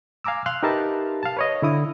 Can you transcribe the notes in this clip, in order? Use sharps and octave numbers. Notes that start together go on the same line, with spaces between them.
F5 G#5 A#5 D6 E6
F5 C6 F6 F#6
D#4 G4 A#4 B4 E5 A5
F5 A5
B4 C#5 D#5
D3 E4 D#6